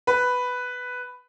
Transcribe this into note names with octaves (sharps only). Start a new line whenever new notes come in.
B4